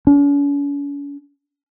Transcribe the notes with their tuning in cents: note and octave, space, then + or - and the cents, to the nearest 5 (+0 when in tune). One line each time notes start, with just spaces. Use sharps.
C#4 +45